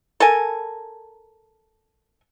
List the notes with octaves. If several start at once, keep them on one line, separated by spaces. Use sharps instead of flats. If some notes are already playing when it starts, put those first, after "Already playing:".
A4 A#4 G#5